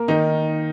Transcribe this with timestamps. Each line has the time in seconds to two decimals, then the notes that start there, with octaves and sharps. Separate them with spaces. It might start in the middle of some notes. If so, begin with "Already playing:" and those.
Already playing: A#3 A#4
0.08 D#3 D#4